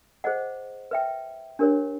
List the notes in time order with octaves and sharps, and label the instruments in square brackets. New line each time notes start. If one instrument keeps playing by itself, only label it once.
[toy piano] G#4 C5 D#5 F#5
B4 E5 G5
D4 G4 A#4 C#5